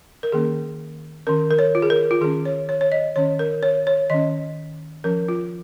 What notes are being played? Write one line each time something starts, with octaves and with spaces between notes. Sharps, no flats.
A#4
D#3 A#3 C#4 G#4
D#3 C#4 A#4
A#4
C#5
F4
G#4
A#4
F4
D#3 C#4 G#4
C#5
C#5
C#5
D#5
D#3 C#4 C#5
A#4
C#5
C#5
D#3 C#4 D#5
F3 C#4 A#4
F4